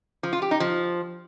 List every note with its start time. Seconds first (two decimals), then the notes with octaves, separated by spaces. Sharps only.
0.23 F3
0.33 F4
0.42 G4
0.51 D#4
0.60 F3